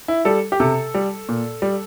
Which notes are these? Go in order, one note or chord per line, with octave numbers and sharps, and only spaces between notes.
E4
G3 A4
G4
C3 A4
G3
A#2
G3